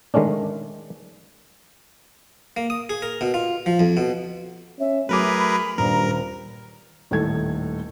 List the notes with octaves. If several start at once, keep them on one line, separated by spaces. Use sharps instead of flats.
D#3 G#3 A3 C#4 D4
A#3
D#6
G#4
A#4
B2
F4
F3
F2
B2
C#4 E5
F#3 A3 G#4 A#4 B4 B5 D6
B5
D#1 G2 A#4 A#5
D#1 A2 D#3 A4 G#6